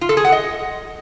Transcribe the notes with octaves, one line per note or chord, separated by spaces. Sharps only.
F4
A4
G#4
F#5
D#5